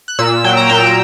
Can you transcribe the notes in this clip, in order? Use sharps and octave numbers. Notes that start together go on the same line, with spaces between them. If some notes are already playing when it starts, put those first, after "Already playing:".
F#6
A#2 E6
F#3 G5
A#5
A#2 G5